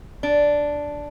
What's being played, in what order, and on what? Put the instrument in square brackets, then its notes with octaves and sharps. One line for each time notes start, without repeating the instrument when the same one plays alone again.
[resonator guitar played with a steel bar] D4